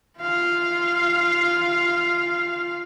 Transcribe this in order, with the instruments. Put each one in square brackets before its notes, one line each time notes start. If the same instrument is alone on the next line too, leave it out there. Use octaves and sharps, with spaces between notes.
[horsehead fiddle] F4 F5